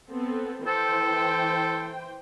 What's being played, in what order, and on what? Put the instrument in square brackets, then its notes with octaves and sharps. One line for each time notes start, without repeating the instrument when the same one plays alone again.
[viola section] B3 C4 A4
[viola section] E3 C5 G5 [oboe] A4